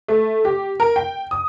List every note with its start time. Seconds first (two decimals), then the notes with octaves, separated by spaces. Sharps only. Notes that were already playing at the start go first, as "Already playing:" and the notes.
0.08 A3
0.45 G4
0.80 A#4
0.96 G5
1.31 D#6